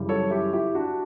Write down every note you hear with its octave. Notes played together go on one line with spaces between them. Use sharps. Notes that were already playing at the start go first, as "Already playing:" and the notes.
Already playing: F#2 C#3 E3 G3
A4 C#5
E4 G4
E4 G4
D4 F#4